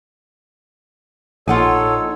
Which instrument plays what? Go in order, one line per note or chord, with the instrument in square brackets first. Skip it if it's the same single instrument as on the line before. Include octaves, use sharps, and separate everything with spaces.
[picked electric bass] A#1 [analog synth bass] D#4 [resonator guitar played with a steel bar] F4 F#5 G#5 [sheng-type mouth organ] A4 C#5